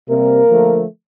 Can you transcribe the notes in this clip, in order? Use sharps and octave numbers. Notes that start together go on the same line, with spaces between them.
C3 G3 A#3 C4 A#4
D3 F3 A3